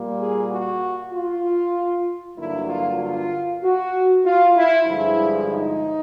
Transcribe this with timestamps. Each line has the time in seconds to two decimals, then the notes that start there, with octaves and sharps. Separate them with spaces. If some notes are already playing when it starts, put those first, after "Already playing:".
Already playing: A#2 G3 A#3
0.19 G#4
0.49 F#4
1.13 F4
2.37 G2 D3 F#3 A#3 E4
2.68 F4
3.00 F4
3.63 F#4
4.24 F4
4.56 E4
4.87 G2 D3 F3 G#3 E4
5.50 D#4